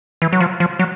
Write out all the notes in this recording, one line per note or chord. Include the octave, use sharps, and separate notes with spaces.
E3
F#3
F3
F3
F#3